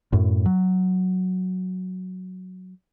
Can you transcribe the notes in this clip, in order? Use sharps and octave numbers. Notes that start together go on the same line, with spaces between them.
F#2 A2
F#3